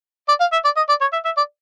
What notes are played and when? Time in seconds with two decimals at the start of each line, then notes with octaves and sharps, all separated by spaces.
0.28 D5
0.40 F5
0.52 E5
0.64 D5
0.76 D#5
0.89 D5
1.01 C#5
1.13 E5
1.25 E5
1.37 D5